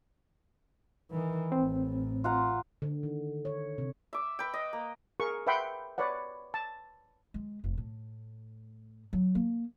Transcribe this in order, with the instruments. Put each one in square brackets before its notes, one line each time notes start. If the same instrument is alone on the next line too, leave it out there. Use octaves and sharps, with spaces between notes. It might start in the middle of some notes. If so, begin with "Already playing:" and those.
[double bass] D#3 E3
[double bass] A1 A2 [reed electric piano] C4
[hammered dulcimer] F4 F#5 A#5
[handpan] D3
D#3
C#5
C3
[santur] E5 D6
B4 G5
D#5
A#3
[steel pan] G#4 A#4 C#6
B4 E5 F#5 G5 B5 C6
B4 C#5 D5 F#5
A5
[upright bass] G#3
F1
A2
F#3
A#3